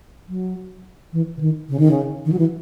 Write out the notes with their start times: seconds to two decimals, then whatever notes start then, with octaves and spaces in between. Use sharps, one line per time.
0.29 F#3
1.13 E3
1.37 C#3
1.41 D#3
1.69 C#3
1.80 D#3
1.91 C#3
2.25 D#3
2.33 F#3
2.39 E3